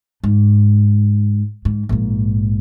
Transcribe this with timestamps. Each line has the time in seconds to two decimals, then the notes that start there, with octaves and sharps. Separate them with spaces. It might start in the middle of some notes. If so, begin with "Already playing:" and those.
0.24 G#2
1.65 G#2
1.89 A#1 G#2